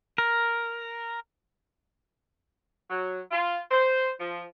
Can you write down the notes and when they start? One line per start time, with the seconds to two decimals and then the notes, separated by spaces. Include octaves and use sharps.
0.18 A#4
2.90 F#3
3.32 F4
3.71 C5
4.20 F3